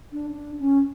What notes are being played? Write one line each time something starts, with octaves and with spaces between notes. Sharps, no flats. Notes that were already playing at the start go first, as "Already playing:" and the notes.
D4
D4
C#4